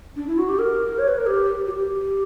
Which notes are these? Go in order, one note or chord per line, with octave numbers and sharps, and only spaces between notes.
D4
E4
F#4
G4
A#4
C#5
B4
A#4
G4
F#4
G4